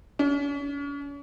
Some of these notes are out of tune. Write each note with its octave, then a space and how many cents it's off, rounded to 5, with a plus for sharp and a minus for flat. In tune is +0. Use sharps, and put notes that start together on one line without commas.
C#4 +40